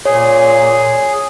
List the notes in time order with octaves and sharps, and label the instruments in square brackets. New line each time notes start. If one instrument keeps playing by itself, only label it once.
[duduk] A#2 [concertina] G#4 [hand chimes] C#5